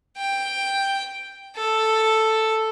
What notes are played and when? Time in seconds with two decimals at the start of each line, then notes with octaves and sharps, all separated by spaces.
0.17 G5
1.56 A4